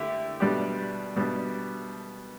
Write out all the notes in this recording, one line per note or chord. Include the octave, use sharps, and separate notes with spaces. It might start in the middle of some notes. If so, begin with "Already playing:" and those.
Already playing: D3 A3 E4 G4
B2 G3 D4 G4
B2 G3 D4 G4